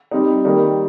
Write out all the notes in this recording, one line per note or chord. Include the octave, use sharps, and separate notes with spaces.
G3 C4 D#4
D#3 G3 A#3 D#4